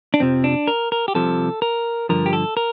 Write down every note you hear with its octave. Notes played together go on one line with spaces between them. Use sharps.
D4
F2 C3 F3 C4
D4
A#4
A#4
G4
C2 C3 F3 A4
A#4
G2 D3 F3 A#4
G4
A4
A#4